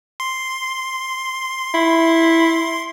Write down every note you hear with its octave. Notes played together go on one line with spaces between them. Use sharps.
C6
E4